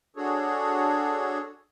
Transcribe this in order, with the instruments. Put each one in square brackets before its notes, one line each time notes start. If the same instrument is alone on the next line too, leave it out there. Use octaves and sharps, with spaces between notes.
[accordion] D4 F#4 G#4 A4 C#5